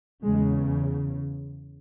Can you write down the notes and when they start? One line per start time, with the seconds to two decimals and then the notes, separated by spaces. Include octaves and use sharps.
0.22 E2 C#3 G#3